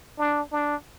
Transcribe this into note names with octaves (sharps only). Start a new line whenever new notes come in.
D4
D4